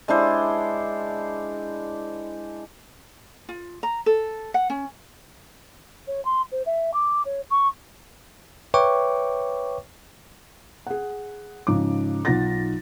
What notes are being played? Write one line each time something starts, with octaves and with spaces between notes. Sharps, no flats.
G#3 D4 E4 C5
F4
A#5
A4
F#5
C#4
C#5
C6
C5
E5
D6
C#5
C#6
B4 C#5 E5 G5 C#6 D6
G#4 F#5
G#2 C#3 F3 D6
B1 D#4 F4 F#5 A6 A#6